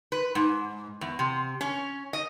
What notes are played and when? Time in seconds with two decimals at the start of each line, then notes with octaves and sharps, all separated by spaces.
0.12 B4
0.35 G#2
1.01 E2
1.19 C3
1.61 C#4
2.13 D#5